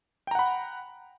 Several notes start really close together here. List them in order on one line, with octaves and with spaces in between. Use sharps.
G5 A#5 F#5 B5